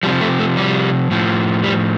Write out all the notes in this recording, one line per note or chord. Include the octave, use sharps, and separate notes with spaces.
C3 F3 G3
A3
A3
G3
A2 F3
G3